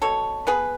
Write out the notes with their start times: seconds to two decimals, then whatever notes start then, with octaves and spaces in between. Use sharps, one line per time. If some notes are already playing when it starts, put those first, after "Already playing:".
0.02 B2 A4 C#5
0.47 B3 G#4 B4